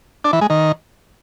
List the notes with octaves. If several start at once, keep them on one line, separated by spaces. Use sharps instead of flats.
D4
E3
G#3
D#3